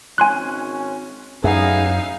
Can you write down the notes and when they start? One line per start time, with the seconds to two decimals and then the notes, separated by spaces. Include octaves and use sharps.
0.18 G#1 C#4 G#5 C6 F#6
1.44 A1 F#2 D#4 E4 G#4 E5 F5